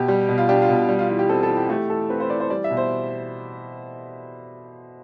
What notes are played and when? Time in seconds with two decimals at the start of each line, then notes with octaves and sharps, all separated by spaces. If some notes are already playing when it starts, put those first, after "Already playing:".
Already playing: B2 G4
0.08 G3
0.29 B2
0.38 F4
0.49 D4 G4
0.62 F4
0.69 B2
0.89 G3
0.99 F4
1.09 E3 F4
1.19 G4
1.29 C4 A4
1.43 A4
1.49 E3
1.56 G4
1.69 A3 G4
1.90 E3 A4
2.10 C4 B4
2.20 C5
2.30 E3 D5
2.40 C5
2.50 G3 D5
2.64 E5
2.70 B2
2.77 C5